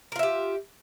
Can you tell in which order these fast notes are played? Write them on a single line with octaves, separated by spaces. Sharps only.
A#4 F4 E5 G4